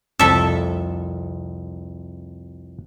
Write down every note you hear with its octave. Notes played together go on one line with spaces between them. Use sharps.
C2 F2 A4 E5